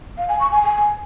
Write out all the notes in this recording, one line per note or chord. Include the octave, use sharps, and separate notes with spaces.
F5
G#5
C#6
G#5
G#5